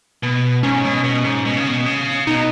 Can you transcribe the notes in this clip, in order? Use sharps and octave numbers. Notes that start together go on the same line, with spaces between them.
B2
G#2 C#4
B2
B2
G#2
B2
C#3
B2
C#3
B2 D#4